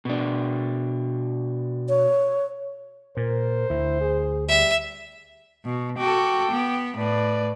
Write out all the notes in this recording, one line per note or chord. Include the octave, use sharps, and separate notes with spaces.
B2 D4
C#5
A#2 A#4 C5
D2 E4
G#4
G3 E5
B2
F#4 A4 G5 D6
B3
A2 B4 D5